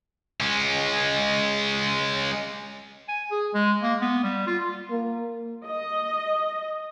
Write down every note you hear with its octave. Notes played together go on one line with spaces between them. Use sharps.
G#3 C#4
G#5
G#4
G#3
A#3
B3
G3
F4
A#3
D#5